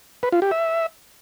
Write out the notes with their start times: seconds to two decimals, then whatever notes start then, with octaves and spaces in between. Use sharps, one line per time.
0.23 B4
0.32 F4
0.42 G4
0.51 E5